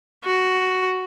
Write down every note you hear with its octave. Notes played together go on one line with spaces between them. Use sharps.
F#4